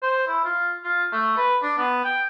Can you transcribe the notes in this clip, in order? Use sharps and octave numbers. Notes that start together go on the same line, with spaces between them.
C5
E4
F4
F4
A3
B4
D4
B3
G5